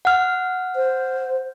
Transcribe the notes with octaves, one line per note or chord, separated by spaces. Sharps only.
F#5 F6
C5